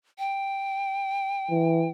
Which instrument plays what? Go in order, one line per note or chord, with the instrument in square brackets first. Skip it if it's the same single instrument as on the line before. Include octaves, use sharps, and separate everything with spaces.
[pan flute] G5
[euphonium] E3